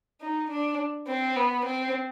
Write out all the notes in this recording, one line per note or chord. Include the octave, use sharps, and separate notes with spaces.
D#4
D4
C4
B3
C4